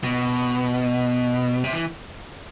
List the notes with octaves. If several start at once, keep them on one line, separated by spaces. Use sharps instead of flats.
B2
C3
E3